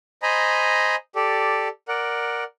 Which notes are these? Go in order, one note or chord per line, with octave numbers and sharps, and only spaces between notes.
C5 D#5 G#5 A#5 B5
G4 A4 D5
A#4 D5 F#5